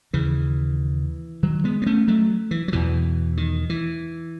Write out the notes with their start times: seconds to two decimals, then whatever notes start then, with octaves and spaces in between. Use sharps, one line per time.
0.13 D#2 C#3 E3
1.43 D#3 F#3
1.64 G#3 B3
1.82 B3
1.86 A3 C#4
2.08 F#3 A3
2.51 E3
2.68 F#3
2.72 E2 B2 E3
3.37 D#3
3.70 E3